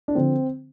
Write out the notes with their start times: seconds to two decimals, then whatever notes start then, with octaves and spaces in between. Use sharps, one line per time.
0.08 D4
0.15 D3 F3 C4